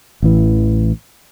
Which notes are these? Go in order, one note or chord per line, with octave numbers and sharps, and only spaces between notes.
A1 E3